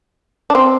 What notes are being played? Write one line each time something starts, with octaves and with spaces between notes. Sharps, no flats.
D4
C4